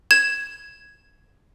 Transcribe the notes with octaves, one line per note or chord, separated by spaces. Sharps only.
G#6 E7